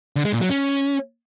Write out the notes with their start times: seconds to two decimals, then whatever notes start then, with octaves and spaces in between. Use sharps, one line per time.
0.16 D3
0.25 G#3
0.33 A#2
0.41 F#3
0.50 C#4